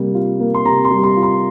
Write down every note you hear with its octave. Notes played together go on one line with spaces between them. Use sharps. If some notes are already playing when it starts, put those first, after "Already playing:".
Already playing: C3 G3 A#3
F4
A#3
C6
C3 A#5
C6
G3
C6
F4
C6